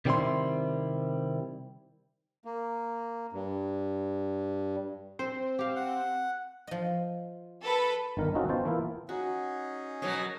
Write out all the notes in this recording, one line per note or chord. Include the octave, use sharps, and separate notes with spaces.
C3 D#3 G3 C4 E4 C6
A#3
G2
C4 C5
G4 F5
F#5
F3 D#5
A4 B4
G1 D#3 A#4
C4 C#4 D#4 F4 F#4 A4
B3 F4 C5 G5 A5
E3 A#3 E4 F4
C#4 D#4 F#4 G#4
B2 F#3 A#4 C#5 D#5